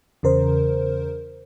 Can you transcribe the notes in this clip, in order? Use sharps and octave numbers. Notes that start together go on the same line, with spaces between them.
E2 C#3 A#4 C5